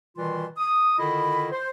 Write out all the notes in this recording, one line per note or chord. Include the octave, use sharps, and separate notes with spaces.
B2 D#3 E3 G3 F4 C6
D#6
D3 D#3 E4 F4 D#5 B5
C5